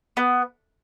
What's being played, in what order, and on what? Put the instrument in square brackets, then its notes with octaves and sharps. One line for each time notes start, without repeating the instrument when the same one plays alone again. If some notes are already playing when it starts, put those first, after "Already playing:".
[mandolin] B3